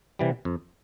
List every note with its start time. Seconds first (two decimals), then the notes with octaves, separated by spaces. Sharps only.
0.19 C3 E3 G3
0.45 F2